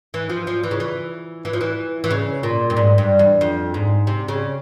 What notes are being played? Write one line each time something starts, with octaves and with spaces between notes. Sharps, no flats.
E3
F3
F3
E3
C#3
E3
E3
F3
E3
E3
C#3
A#2
G2
G#2
G2
E2
F2
G#2
C3
C#3